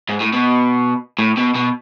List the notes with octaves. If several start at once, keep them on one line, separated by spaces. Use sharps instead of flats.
G#2
A2
B2
A2
B2
B2